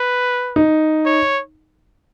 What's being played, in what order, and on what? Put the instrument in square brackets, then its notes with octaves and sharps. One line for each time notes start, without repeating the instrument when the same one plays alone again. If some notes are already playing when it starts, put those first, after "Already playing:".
Already playing: [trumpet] B4
[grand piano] D#4
[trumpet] C#5